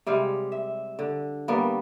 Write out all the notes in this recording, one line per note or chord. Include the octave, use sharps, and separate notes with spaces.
C3 G3 G#3 F5
E5
D3
G3 A#3 B3